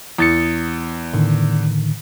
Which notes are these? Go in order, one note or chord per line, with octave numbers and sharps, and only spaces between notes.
E2 D#6 A6 C#7
A2 D3 D#3